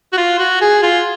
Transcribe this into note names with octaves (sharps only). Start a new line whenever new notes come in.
F#4
F4
F#4
G#4
F4